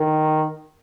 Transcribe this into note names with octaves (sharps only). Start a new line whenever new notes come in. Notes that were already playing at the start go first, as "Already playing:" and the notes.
Already playing: D#3